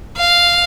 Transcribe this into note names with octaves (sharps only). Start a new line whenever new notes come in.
F5